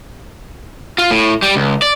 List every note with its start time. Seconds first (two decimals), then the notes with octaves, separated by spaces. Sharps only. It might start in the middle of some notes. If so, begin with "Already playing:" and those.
0.98 F4
1.10 A2
1.42 G3
1.56 C#2
1.82 D5